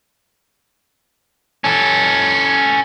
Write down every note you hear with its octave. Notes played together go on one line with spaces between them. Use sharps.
C#4 A4